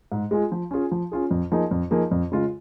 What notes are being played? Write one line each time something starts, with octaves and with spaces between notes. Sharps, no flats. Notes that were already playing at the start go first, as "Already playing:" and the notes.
G#2
G#3 F4 G#4
F3
C#4 F4 G#4
F3
C#4 F4 G#4
F2
F3 A#3 D#4 G#4
F2
F3 A#3 D#4 G#4
F2
C#3 G#3 F4